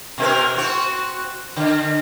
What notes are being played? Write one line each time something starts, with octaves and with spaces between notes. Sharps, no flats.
B2 C4 A#4
C4 F#4
D3